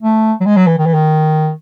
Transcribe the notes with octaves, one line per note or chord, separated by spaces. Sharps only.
A3
F#3
G#3
F#3
E3
D#3
E3
D#3